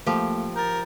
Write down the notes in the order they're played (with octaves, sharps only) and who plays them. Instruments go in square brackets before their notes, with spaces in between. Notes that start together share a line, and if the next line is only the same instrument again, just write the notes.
[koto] F3 G4 [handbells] A3 A#3 A4
[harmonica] A#4 [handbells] G6 A6